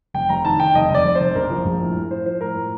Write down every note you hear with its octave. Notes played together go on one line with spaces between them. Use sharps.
F1 G5
F1 A#5
D#3 A5
D#3 G5
F1 D#5
F1 D5
F1
C5
F1
A#1 A#4
F3
A#1
A2
A2
F3 C5
F3 C5
A2 A#4
A2